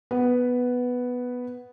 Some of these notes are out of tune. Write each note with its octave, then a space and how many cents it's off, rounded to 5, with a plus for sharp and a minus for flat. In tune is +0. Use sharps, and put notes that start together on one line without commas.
B3 +0 B4 +0